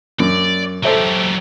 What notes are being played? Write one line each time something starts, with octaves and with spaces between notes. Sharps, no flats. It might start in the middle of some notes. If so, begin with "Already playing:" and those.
F#2 D5
F#3 G4 A4 C5 E5